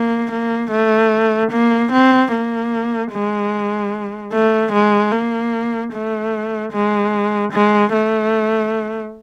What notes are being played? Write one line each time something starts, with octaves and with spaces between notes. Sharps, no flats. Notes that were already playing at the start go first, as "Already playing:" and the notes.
Already playing: A#3
A#3
A3
A#3
C4
A#3
G#3
A3
G#3
A#3
A3
G#3
G#3
A3